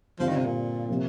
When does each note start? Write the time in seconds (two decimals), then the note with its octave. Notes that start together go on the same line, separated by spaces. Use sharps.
0.20 G2 D3 F3 G3 C4 F4
0.28 D#3
0.37 C3
0.45 A#2
0.89 C3 F3 A#3